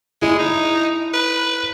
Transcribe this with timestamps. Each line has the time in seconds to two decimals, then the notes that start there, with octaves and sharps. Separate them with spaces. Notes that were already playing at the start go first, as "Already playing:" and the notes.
0.22 G#3 E4
0.39 D#4
1.13 B4